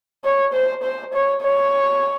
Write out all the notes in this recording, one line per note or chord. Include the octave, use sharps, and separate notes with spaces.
C#5
C5
C5
C#5
C#5